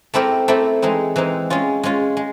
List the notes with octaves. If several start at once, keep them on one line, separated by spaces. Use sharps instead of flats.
A3 C4 E4 G4 A#4
A3 C4 E4 G4 A#4
E3 G#3 C4 D#4
E3 G#3 C4 D#4
G#3 C#4 F4
G#3 C#4 F4
G#3